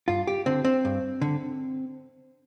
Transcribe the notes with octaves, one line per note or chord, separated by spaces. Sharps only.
G2 F4
G4
D3 C4
C4
G2
D3